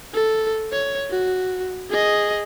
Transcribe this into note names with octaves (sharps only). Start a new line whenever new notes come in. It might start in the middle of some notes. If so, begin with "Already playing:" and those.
A4
C#5
F#4
G#4 D#5